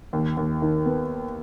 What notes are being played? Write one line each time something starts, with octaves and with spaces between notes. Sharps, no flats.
D#2
D#2
D#3
B3